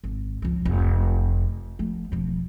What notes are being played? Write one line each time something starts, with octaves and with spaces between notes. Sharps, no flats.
G#1
C#2 F3
F1
F3 A3
E1 F3